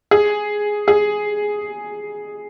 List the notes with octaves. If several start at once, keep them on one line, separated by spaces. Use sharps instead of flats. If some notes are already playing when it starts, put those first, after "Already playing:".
G#4
G#4